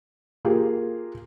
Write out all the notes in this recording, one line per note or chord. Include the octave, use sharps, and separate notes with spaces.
A#3 F4 G4 G#4 A#4